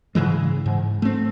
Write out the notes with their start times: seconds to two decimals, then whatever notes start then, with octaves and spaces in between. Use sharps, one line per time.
0.15 G#2 C#3 E3 G#3
0.66 G#2
1.02 A3 C4